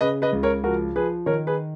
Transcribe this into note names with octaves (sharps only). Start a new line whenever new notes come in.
C#3 B4 D#5
B4 D#5
C#2
A#4 C#5
F3 F#4 A#4
F3 G#4 B4
D#3 A#4 C#5
G#4 B4